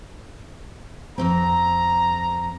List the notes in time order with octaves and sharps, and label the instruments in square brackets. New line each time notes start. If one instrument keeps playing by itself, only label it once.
[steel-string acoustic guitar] F2 G#2 C4 [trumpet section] A#5